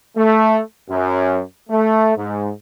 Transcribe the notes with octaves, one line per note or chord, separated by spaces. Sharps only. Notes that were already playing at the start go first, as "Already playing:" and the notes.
A3
F#2
A3
G#2